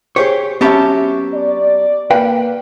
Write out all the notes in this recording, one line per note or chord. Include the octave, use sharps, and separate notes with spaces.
G4 G#4 C5 C#5
F#3 B3 C#4 G4 E5 A5
D5
A#3 B4 F5 G5